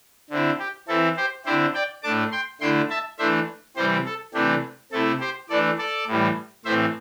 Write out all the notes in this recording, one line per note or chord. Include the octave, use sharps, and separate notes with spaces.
D3 C4 E4
G4
E3 C4 E4 A4
G4 C5
D3 C4 E4 G4 C5
D5 G5
A2 A3 D4 A5 D6
G5 C6
D3 A3 E4 G5 C6
E5 A5
E3 A3 D4 C5 E5
C3 E3 G3 C4 G4 C5
A4
C3 E3 A3 D4 G4
C3 A3 E4 A4
G4 C5
E3 A3 D4 A4 D5
A4 D5
A2 E3 G3
A2 E3 C4 C5 E5